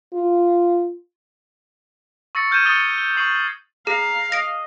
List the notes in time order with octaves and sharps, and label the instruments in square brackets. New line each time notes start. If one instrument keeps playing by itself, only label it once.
[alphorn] F4
[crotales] C#6 E6 A6 A#6 C#7
F6 G6 G#6 D#7 E7
C#6 D#6 A6 C#7 G7
G7
C#6 C7 F#7
[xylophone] G#4 [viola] F5 [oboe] A#5
[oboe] D#5 [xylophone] A#6 D7